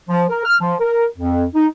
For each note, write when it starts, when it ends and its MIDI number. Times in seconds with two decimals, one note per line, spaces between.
0.09 0.24 53
0.30 0.44 70
0.45 0.56 89
0.61 0.75 53
0.81 1.05 70
1.17 1.44 41
1.55 1.67 63